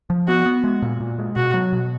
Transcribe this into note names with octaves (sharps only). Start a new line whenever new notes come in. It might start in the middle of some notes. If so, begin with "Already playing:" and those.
F3
B3 F#4
B3
G#3
A#2
A#2
G#3
B2 F#4
F#3
B2